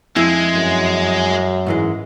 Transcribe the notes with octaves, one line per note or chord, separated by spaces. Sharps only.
F2 G#3 E4
F#2
G#2 E3 G#3